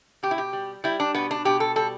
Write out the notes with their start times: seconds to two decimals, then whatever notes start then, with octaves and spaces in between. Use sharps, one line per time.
0.23 B2 G4
0.31 E4
0.38 G4
0.53 G3
0.84 G3 E4
1.00 D4
1.15 B2 B3
1.31 D4
1.45 B2 G4
1.60 A4
1.76 G3 A4